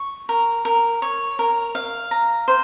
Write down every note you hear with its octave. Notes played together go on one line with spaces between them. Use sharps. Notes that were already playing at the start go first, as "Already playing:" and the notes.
Already playing: C#6
A#4
A#4
C#5
A#4
F5
A#5
C5